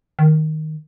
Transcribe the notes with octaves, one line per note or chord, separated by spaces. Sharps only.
D#3